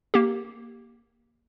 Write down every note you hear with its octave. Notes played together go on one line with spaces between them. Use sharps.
A#3 G4